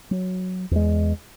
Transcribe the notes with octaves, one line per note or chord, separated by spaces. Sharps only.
F#3
E2 G#3